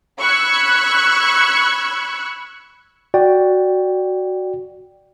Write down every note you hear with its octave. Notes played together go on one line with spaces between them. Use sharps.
B5 C#6 E6 F#6 G#6
F#4 D5 G5